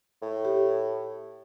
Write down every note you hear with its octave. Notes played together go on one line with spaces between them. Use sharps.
A2
G4